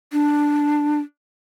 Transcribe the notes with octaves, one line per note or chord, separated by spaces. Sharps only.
D4